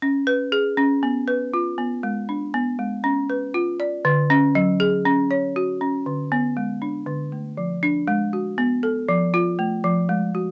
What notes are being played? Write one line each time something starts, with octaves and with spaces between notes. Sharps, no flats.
C#4
B4
G#4
C#4
B3
B4
F4
B3
G#3
D4
B3
G#3
C#4
B4
F4
D5
D3
C#4
F#3
G#4
C#4
C#5
F#4
C#4
D3
B3
G#3
D4
D3
A3
F3
D4
G#3
F#4
B3
A4
F3
F4
A3
F3
G#3
F#4